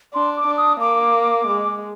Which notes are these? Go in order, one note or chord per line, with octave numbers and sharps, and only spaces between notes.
D4 C6
D6
D4
D#6
A#3 D6
G#3